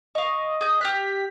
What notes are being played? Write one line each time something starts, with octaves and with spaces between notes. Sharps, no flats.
D#5 F5 C#6
G#4 G6
G4 F6 F#6 B6